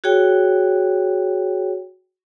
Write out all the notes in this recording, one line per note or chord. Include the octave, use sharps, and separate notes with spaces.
F#4 G#4 C#5 G5